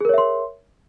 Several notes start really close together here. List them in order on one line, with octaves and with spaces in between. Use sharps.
G#4 A#4 C#5 E5 C6